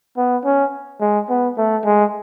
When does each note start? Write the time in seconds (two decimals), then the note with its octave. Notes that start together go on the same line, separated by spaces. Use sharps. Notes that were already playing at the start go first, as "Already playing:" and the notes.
0.17 B3
0.45 C#4
1.01 G#3
1.30 B3
1.58 A3
1.85 G#3